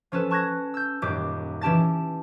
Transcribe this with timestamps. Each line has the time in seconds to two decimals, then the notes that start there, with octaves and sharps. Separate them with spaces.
0.12 F3 C#4 A4 B4
0.30 A5 C#6 F#6 G#6 A#6
0.74 E6 G6
1.02 D#1 F#2 G4 D6 G6
1.61 E3 C#4 G4 A5 A6